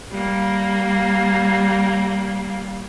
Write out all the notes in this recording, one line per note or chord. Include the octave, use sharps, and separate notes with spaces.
G3 A#3